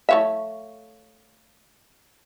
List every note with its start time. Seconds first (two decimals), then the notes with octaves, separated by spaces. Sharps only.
0.09 A3 C#5 E5 F5 C#6